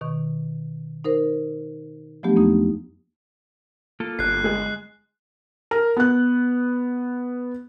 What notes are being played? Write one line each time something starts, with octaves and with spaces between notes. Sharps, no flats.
B2 D#3 C#6
D#4 A#4 C5
F3 F#3 A3 B3 D4 G4
F2 A#3 D#4
A#3 F4 A4
G1 F#6 C7
G#3 G#4
A#4
B3 F#6